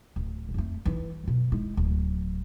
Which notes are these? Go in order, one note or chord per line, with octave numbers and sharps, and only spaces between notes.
D1
F2 A3
E3 E4
B2 F#3
G#3 E4
D1 F#3